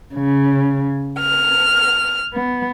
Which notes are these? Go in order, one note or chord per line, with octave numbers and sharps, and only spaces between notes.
C#3
F6
B3